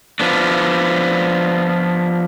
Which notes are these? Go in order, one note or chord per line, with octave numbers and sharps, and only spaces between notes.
F3 B3 D4